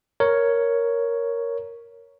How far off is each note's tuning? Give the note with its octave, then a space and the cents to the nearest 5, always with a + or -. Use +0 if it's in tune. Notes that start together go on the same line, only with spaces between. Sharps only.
A#4 +0 C#5 +5